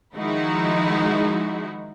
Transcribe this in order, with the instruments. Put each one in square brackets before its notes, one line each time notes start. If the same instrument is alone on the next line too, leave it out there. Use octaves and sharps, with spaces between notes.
[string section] D#3 F3 G#3 D#4 E4 F#4